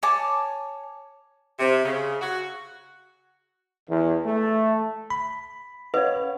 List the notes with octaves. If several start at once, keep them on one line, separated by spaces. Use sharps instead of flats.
C#5 G#5 A5 D6
C3
C#3
F#4
E2
A3
B5
C#4 B4 C#5 D#5 F5 F#5